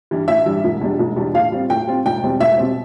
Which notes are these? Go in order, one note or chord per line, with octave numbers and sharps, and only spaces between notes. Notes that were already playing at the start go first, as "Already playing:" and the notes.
G2 E3 G3
A1 E5
G2 E3 G3
E1
E2 B2 G3 D4
E1
E2 B2 G3 D4
A2 F5
G3 C4 F4
A2 G5
G3 C4 F4
E1 G5
E2 B2 G3 C4
E1 E5
B2 G3 C4